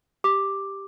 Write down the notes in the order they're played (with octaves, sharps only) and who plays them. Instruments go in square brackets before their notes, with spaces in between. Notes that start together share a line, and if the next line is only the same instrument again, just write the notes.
[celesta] G4 D6